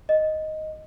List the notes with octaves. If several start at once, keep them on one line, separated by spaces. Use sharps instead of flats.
D#5